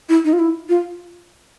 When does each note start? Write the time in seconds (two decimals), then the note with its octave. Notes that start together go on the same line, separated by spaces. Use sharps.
0.09 E4
0.25 D#4
0.33 F4
0.39 E4
0.69 F4